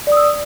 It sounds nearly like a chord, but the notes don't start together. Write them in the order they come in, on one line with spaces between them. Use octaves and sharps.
D5 D#6 E6